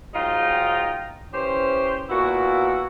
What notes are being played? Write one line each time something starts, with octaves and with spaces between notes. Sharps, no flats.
G#2 F#3 D#4 F4 G5 A#5
E3 C#4 G4 C5
A#2 B3 E4 F#4